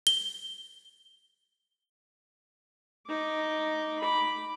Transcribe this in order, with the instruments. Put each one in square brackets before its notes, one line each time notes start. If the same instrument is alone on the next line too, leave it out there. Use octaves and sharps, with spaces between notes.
[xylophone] G7
[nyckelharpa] D#4 D6
B5 D6